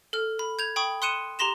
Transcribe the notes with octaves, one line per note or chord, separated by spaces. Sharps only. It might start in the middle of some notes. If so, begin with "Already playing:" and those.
A4 F6
B5
G6 G#6 F7
G5 B5 C#6 D#6
C6 D#6 F#6 C#7 D#7 E7
G4 A#5 C6 A#6 E7